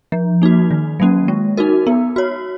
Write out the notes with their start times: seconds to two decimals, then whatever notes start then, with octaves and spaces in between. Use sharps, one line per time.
0.12 F3
0.42 A#3 D#4 F#4
0.71 D#3
1.00 F#3 A#3 C#4
1.28 G#3
1.57 D#4 F#4 A#4
1.87 B3
2.16 F#4 C#5